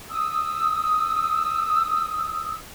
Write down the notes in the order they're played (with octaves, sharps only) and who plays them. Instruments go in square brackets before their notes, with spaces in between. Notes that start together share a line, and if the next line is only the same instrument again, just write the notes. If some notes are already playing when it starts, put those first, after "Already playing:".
[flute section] D#6 E6